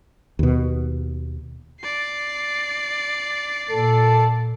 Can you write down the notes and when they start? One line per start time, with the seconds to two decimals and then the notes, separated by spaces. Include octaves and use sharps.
0.39 D#2 B2
1.81 D5 C7
3.70 A#2 A4